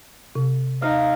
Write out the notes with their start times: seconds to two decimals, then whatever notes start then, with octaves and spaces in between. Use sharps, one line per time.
0.35 C3
0.82 D#4 F5